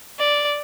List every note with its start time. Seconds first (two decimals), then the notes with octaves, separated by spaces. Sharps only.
0.19 D5